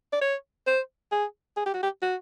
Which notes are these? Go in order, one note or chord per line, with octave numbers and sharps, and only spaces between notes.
D5
C#5
C5
G#4
G#4
G4
F#4
G4
F#4